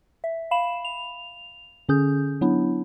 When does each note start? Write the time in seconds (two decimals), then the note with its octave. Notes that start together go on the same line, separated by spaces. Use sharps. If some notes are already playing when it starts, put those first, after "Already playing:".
0.24 E5
0.51 F5 B5 E7
0.85 F7
1.89 D3 C#4 G#4 G6
2.41 F#3 B3 D4 E4